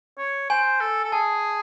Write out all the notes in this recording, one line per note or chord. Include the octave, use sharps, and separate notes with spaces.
C#5
C5 G#5
A4
A4
G#4 A5